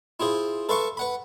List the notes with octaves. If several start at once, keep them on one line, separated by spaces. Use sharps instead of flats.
E4 F4 G#4 C5
A4 B4 E5 F5 C6 C#6
B4 F#5 B5